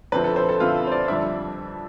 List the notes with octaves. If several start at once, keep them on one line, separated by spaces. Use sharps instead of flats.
F2 D3 F3 C4 E4 B4
A4
C5
A4
F2 D3 F3 C4 E4 F4
C5
D5
F2 D3 G3 D4 E5